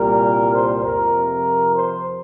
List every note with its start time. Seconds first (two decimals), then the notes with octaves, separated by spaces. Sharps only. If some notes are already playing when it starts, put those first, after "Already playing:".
Already playing: C2 A#2 G3 A#4
0.52 C5
0.83 F2 C3 F3 A#4
1.74 C5